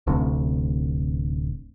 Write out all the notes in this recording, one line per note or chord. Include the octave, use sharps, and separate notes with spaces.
D1 A1 D2 C3